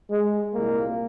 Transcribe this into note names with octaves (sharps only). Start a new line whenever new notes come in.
G#3
C2 A#2 A#3